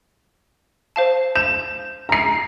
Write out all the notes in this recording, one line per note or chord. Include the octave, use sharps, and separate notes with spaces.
C5 F5 A5
G6 E7
A#5 C7